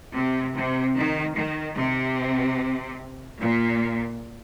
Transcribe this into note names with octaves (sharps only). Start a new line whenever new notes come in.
C3
C3
D#3
D#3
C3
A#2